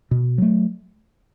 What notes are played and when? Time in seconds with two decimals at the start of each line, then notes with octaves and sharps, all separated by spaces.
0.11 B2
0.38 F#3 A3